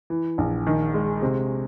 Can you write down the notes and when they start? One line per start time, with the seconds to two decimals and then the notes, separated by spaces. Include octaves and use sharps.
0.10 E3
0.38 A#1
0.67 D#3
0.94 G#3
1.22 C3